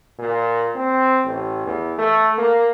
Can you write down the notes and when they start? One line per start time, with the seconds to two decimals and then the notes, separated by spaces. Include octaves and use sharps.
0.19 A#2
0.76 C4
1.25 A1
1.66 E2
1.98 A3
2.38 A#3